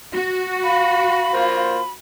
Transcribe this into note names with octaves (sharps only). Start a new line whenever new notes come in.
F#4
F5 B5
A#3 F4 C5